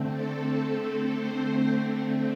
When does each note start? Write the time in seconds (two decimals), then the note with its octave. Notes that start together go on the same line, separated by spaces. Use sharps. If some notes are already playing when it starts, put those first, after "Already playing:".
Already playing: D3 A3 C4
0.13 A4
0.44 A4
0.74 A4
1.19 C5